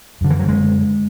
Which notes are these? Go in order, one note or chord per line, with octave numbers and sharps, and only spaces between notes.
F#2 D3
E3
F#3
G#3